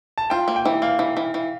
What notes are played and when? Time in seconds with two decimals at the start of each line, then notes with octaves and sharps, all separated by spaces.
0.18 A5
0.30 F4 G5
0.48 A#3
0.56 G5
0.66 E3
0.82 A#3 F5
0.99 E3
1.17 E3
1.34 E3